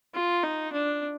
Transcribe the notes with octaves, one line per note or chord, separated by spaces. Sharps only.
F4
D#4
D4